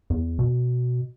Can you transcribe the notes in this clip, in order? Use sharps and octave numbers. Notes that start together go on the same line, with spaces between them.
E2
B2